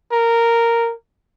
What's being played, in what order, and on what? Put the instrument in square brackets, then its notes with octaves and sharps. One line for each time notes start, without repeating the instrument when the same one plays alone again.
[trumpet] A#4